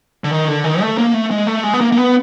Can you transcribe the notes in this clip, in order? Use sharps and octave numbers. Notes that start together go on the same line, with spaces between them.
D3
D#3
D3
D#3
A3
A#3
A3
G#3
A3
G#3
B3
A#3
A#3
B3